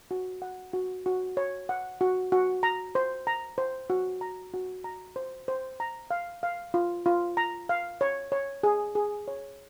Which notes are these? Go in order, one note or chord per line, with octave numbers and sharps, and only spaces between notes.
F#4
F#5
F#4
F#4
C#5
F#5
F#4
F#4
A#5
C5
A#5
C5
F#4
A#5
F#4
A#5
C5
C5
A#5
F5
F5
F4
F4
A#5
F5
C#5
C#5
G#4
G#4
C#5